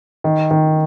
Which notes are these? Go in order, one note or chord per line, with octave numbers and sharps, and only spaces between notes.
D#3
D#3